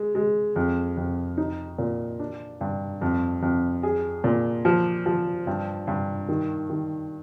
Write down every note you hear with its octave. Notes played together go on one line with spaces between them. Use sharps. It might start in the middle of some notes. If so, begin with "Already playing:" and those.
Already playing: G#3
G#3
F2
F2
D#4
A#2
D4
G2
F2
F2
G#4
A#2
F3
F3
G2
G2
D#3
D#3